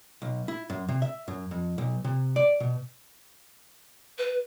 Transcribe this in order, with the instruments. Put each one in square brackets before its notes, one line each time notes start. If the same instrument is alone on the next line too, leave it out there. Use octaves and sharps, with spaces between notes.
[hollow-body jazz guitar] B1
E4
F#2
C3
E5
F#2
F2
B1
C3
D5
B2
[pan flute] B4